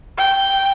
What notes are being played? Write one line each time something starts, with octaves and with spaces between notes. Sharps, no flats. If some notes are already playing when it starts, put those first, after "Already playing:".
G5